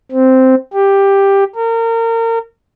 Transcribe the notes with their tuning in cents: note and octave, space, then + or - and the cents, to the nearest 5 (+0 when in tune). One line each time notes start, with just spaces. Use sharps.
C4 -5
G4 +10
A#4 -30